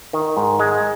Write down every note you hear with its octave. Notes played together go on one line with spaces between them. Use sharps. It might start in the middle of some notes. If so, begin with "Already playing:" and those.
D#3
G#2
G#3